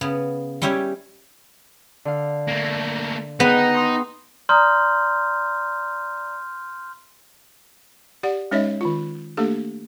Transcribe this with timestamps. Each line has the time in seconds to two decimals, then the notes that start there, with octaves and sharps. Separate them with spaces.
0.01 C#3 B3
0.62 G3 C#4 E4 G4 C#5
2.05 D3 F5
2.48 A3 A#3
3.40 B3 D#4 G#4 G5 F#6
3.74 B5 C6 D#6
4.49 D5 A#5 C6 D#6 F6 G6
8.23 G4 D5 F#5
8.51 G#3 C#4 D#4 C#5 D#5 E5
8.81 D#3 F4
9.37 A3 A#3 D4 G4 A4